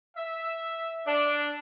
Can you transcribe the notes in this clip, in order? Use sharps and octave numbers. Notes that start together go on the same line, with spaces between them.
E5
D4